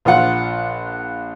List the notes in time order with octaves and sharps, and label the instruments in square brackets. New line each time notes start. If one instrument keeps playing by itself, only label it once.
[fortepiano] A#1 F4 F#5 F#6